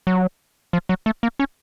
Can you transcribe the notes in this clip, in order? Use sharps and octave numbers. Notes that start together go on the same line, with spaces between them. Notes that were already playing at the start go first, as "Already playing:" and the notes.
F#3
F3
F#3
A3
A#3
C#4